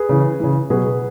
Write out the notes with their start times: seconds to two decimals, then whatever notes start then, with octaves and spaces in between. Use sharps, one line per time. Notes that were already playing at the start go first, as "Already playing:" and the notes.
Already playing: G#4 B4
0.09 C#3 E3
0.40 C#3 E3
0.70 B2 F#3 G#4 B4